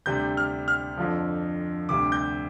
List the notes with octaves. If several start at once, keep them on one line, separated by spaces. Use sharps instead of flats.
D2 C3 G3 G6
F6
F6
F2 D3 F3
D2 C3 G3 D6
G6